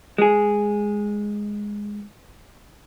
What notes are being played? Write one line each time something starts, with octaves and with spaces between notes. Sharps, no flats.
G#3 G#4